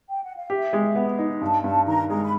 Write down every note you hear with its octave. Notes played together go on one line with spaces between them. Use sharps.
G5
F#5
F5
G4 E5
G#3
B3
D#4
G2 A5
G2 A5
D#3 A#5
G#3 A#5
B5